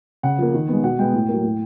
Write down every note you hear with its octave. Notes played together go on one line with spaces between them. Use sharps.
C#3 F#5
F3 A#3
D#3
G#3 B3
B2 F#5
G#3 B3 G5
A2
F#3 A#3
A2